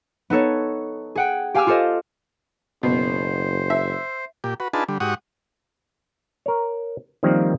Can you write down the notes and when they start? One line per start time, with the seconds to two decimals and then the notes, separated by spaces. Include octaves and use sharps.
0.30 B3 D#4 A4 C#5
1.15 G#4 F#5 G5
1.54 G4 F5 G#5 D6 E6 F6
1.67 F4 G4 A4 C5 D#5
2.83 F#1 B2 C5
3.70 E5
4.44 A#2 G4
4.60 F#4 B4
4.74 D4 D#4 F4 G#4 B4 A5
4.89 D3 G3
5.00 G#2 F#4 G4 F#5 C#6 D#6
6.46 A#4 C#5
7.23 D#3 F3 G3 A#3 C4